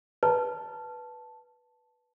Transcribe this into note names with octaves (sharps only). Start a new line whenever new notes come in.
B4 A5